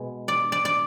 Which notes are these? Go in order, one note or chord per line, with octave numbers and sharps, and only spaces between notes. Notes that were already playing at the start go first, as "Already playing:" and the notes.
Already playing: B2 G#3
D5
D5
D5